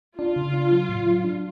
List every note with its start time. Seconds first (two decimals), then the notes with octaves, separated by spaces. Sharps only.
0.19 D4 F4
0.36 C#3
0.54 D4
0.72 F#3
0.89 A2
1.07 F#3
1.24 D4